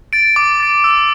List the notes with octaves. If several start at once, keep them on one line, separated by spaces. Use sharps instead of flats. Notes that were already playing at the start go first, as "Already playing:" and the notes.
A6 D7
D6
A6 D7
E6